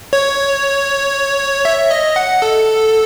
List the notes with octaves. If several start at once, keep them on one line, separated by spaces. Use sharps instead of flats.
C#5
E5
D#5
F#5
A4